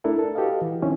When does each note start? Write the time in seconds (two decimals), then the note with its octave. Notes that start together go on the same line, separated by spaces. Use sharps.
0.04 A3 D4 E4 A4 A#4
0.19 A4
0.35 F#4 G4 A4 B4 D#5 F5
0.62 E3
0.82 D#3 F3 C4 C#4 E4